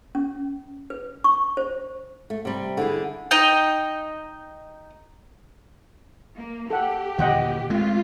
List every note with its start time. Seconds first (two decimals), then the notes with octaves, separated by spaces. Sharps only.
0.15 C#4
0.90 B4
1.24 C#6
1.57 C5
2.30 A3
2.45 C3 G3
2.77 D3 E4 G#4
3.31 D#4 D#5 G5
6.37 A#3
6.70 G4 A4 F#5
7.18 D#2 A#2 D3 D#5 F#5 G5
7.70 G#3 A3 C4 F4